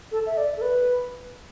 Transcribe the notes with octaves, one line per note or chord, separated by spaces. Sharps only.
A4
E5
D5
A4
B4